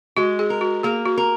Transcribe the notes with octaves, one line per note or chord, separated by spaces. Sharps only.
G#3 F#4
G#4
A#4
F#4
A#3 G#4
F#4
A#4